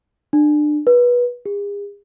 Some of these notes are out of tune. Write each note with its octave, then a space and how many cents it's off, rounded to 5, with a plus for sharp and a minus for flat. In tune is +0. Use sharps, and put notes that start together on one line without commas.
D4 +30
B4 -20
G#4 -40